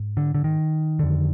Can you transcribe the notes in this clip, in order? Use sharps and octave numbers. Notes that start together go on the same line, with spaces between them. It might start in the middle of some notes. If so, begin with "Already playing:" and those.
Already playing: G#2
D3
D3
D#3
F2 D3